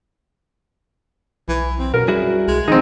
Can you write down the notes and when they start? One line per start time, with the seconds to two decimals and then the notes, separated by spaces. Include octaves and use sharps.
1.48 B1 E3
1.79 C4
1.94 F#2 B2 A#4
2.08 G3 E4 F#4 G#4
2.48 C2 G#3
2.68 D#3 C4 D#4 G#4